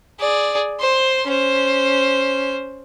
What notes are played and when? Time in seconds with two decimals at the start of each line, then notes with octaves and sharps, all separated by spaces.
0.19 G#4 D5
0.80 C5 C6
1.28 C#4 C5